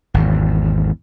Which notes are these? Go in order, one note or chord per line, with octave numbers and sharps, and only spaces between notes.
G#1 E2